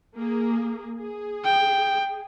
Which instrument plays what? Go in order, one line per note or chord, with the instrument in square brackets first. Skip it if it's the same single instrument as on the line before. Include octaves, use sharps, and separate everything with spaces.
[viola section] A#3 G#4
G#4
[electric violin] G5